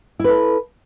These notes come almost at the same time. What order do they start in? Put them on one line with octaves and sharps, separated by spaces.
E4 B4 A4